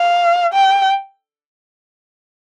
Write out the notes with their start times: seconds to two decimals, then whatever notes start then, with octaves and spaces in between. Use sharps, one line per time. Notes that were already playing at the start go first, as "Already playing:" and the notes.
Already playing: F5
0.53 G5